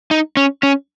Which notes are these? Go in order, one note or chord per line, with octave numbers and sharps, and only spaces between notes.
D#4
C#4
C#4